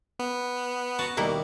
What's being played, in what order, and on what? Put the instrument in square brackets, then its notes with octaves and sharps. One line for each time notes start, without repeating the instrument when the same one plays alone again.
[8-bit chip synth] B3
[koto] F#4 [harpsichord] A5 A#5
[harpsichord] D#2 G3 [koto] B2 A#3 E4